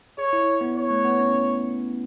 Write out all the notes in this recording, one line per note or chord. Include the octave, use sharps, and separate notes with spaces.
G#4 C#5
E4
B3
C#5
A3
B3
C#4